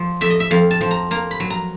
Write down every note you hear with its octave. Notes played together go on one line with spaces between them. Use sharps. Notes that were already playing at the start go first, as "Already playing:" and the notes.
Already playing: F3
F2 E5
D#5
E5
F2 F5
A5
F3
A#5
A#3 A#5
B5
F#3
A#5